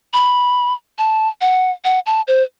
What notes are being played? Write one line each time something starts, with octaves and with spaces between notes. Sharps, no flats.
B5
A5
F#5
F#5
A5
C5